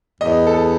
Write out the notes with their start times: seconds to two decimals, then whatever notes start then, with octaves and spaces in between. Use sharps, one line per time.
0.21 E2 D#5
0.47 A4